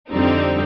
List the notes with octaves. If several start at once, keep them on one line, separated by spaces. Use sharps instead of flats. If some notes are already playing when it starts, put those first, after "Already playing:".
F2 D3 G3 C4 D#4